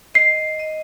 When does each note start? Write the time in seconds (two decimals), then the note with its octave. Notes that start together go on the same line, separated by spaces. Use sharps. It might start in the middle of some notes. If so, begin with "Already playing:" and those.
0.14 D#5 C7
0.59 D#5